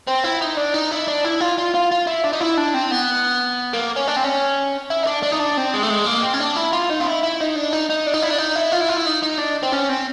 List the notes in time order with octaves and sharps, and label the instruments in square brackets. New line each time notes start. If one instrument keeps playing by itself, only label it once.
[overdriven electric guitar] C4
E4
D#4
D4
D#4
E4
D4
E4
F4
F4
F4
F4
E4
D4
D#4
E4
D4
C4
B3
A#3
C#4
D4
C4
C#4
E4
D#4
D4
D4
D#4
D4
C4
G#3
A3
G#3
A#3
C4
C#4
D4
E4
F4
D#4
F4
E4
E4
D#4
D4
D#4
D#4
D4
D#4
E4
D4
D#4
E4
F4
E4
F4
E4
D#4
D#4
D4
C4
C#4
C4